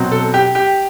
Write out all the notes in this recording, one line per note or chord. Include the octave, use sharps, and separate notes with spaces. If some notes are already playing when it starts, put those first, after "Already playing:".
Already playing: B2 F#3 C4
A4
G4
G4